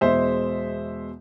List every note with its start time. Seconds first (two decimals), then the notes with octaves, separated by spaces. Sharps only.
0.01 E2 B2 G#3 C5 E5